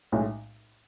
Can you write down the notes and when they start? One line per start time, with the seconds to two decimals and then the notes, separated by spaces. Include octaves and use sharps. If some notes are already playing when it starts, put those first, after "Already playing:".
0.12 B1 A2 G#3 C#4